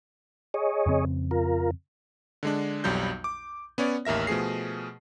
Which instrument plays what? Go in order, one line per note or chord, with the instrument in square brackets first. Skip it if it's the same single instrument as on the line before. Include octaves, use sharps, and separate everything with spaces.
[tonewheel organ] G#4 C#5 D#5
[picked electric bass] F2 C#3 C4
[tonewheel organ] F4 A#4
[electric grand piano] D3 G#3 D4
B1 F2 F#3 G3 G6
D6
B3 C#4 C#5 D5
A1 D#2 A#4 E5 A#6
B2 F3 A3 G#4 C7